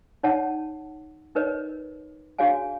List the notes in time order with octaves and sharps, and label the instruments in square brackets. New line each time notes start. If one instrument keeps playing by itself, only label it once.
[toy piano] D#4 C#5 F#5 A5
D#4 A#4 B4 C#5 D#5
D4 F#4 G#4 C#5 F5 G#5